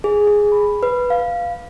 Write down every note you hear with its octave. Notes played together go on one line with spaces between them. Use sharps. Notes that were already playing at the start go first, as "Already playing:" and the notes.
G#4
G#4
B5
B4
F5